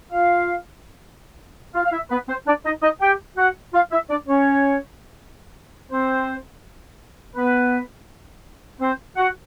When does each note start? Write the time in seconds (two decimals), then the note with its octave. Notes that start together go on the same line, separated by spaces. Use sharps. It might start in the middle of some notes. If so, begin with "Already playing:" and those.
0.11 F4 F5
1.75 F4 F5
1.85 F5
1.92 E4 E5
2.10 B3 B4
2.28 C4 C5
2.47 D4 D5
2.64 D#4 D#5
2.82 D#4 D#5
3.00 G4 G5
3.37 F#4 F#5
3.74 F4 F5
3.91 E4 E5
4.10 D4 D5
4.27 C#4 C#5
5.91 C4 C5
7.35 B3 B4
8.80 C4 C5
9.16 F#4 F#5